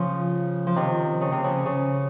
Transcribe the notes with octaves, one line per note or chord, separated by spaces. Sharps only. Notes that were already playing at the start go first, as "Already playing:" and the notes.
Already playing: C#3 F3
F3
C3 D#3
C#3
C3
C#3
C#3